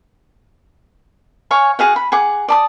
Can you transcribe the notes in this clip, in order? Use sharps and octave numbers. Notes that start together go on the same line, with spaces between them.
C#5 F5 G#5
F#4 G#4 F5 F#5
B5
G#4 F#5 D6
D5 A5 D#6